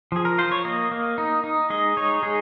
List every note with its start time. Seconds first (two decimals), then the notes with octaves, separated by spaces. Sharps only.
0.12 F3 G#4
0.25 A#4
0.38 F4 C5
0.52 C#5
0.65 A#3 D#5
0.91 A#3
1.18 D#4
1.44 D#4
1.70 G#3 D#5
1.97 D#4 C#5
2.23 G#3 G#4